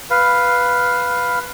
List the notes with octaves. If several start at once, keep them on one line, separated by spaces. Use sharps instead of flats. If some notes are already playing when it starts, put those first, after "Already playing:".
B4 F5